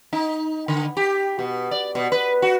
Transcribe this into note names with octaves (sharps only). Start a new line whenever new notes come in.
D#4
D3
G4
B2
D5
B2
B4
F#4